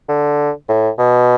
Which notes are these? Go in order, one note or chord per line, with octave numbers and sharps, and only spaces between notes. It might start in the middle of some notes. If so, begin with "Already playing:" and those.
D3
A2
B2